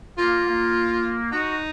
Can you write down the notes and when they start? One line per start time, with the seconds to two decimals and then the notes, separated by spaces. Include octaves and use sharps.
0.18 A#3 F4
0.47 A#3
1.32 D#4 F#4